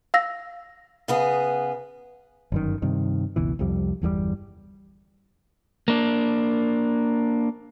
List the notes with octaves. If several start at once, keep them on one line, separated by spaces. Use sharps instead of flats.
F5 E6 A#6
C#3 B3 G#4
G1 F#2 D#3
G2 C3 D#3
F#1 C#2 B2 E3
C2 F2 G3
G1 E2 C#3 G3
A#3 D4